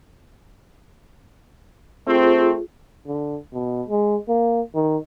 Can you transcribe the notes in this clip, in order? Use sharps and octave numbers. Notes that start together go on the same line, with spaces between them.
A3 C4 F4 G#4
D3
B2
G#3
A#3
D#3